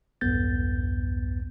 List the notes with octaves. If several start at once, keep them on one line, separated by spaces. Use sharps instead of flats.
B1 E2 G2 B3 G6 A6